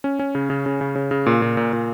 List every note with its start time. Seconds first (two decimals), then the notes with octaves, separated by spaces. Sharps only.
0.04 C#4
0.19 C#4
0.35 C#3
0.50 C#3
0.66 C#3
0.81 C#3
0.96 C#3
1.11 C#3
1.26 A#2
1.42 A#2
1.57 A#2
1.73 A#2